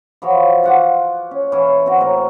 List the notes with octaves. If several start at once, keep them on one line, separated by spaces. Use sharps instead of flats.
E3 F3 F#4 C#5
F4 F#5 D6
C#4
E3 C#4
C4 F#4
A2 A#4